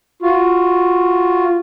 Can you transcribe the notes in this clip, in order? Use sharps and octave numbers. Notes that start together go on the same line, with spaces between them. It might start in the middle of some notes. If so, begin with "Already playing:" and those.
F4 F#4